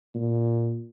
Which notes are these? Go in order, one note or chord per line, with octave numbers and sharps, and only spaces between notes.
A#2